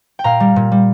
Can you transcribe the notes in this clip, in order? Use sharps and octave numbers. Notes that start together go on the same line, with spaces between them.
G5
A#2 F5 A#5
G3
A#2
G3